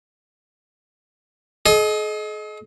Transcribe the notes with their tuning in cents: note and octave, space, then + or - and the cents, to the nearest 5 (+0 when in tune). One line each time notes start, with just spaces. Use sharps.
G#4 +45 D#5 +0